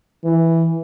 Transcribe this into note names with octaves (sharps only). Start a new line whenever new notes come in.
E3